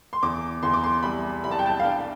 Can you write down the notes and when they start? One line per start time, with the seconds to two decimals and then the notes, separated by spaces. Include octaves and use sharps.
0.13 C6
0.23 E2 D6
0.63 E2 C6
0.74 D6
0.84 C6
1.03 C2 B5
1.44 C2 B5
1.51 A5
1.59 G5
1.66 A5
1.80 F5
1.84 D4 G5